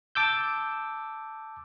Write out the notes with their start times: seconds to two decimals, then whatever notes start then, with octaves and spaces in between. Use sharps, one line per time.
0.15 A5 D6 E6 G6